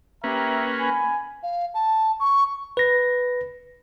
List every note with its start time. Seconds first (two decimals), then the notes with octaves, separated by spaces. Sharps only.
0.24 A#3 C#4 G4 B4 E5 A#5
0.78 G#5 B5
1.43 F5
1.74 A5
2.20 C#6
2.77 B4 A#6